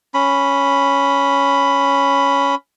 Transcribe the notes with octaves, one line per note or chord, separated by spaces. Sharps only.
C#4 B5